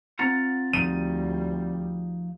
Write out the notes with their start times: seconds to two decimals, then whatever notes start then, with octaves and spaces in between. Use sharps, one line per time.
0.19 C4 F4 F#5 A#5 A6
0.73 D2 F3 G3 D#4 D#7